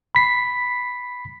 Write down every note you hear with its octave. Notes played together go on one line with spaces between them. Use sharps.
B5 B6 C7